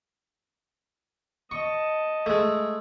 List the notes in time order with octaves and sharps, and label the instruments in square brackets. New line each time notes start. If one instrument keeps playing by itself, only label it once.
[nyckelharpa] D#5 A5 [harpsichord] C#6
[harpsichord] G#3 A3